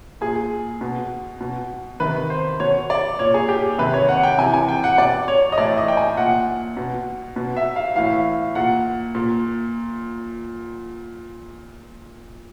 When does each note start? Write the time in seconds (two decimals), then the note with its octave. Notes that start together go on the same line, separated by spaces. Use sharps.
0.21 A#2 G#4
0.81 B2
1.41 B2
2.00 C3 D#3 B4
2.30 C5
2.60 B2 C#5
2.90 D5
3.19 A#2 C#5
3.34 G#4
3.49 G4
3.78 C3 D#3 B4
3.94 C#5
4.09 F#5
4.23 G5
4.38 C3 E3 G#5
4.54 G#5
4.69 G5
4.84 F#5
4.98 B2 D5
5.28 C#5
5.52 D#5
5.58 A2 E3 D5
5.78 D#5
5.88 G5
5.97 G#5
6.17 A#2 F#5
6.77 B2
7.36 B2
7.57 E5
7.76 F5
7.96 A2 E3 F5
8.55 A#2 F#5
9.15 A#2